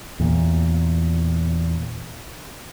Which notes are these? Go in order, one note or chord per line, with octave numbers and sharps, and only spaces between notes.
E2 A#2